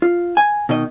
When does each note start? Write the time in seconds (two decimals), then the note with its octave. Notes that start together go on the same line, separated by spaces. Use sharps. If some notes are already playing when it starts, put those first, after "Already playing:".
0.02 F4
0.37 G#5
0.69 B2 D#3 D#5